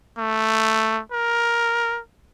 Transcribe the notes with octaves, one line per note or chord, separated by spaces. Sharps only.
A3
A#4